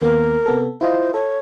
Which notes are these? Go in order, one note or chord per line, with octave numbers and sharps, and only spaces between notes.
D#2 A#3 B3 A#4
C3 B3 A4
E4 F4 C5 D#5
A4 C#5